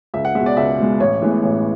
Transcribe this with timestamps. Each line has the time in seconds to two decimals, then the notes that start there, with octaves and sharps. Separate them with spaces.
0.14 C#2 E5
0.25 F#5
0.35 G#3 E5
0.39 B2
0.46 D5
0.57 C#2 E5
0.78 B2 G#3
1.00 A1 C#5
1.22 A2 E3 G#3 B3
1.43 A1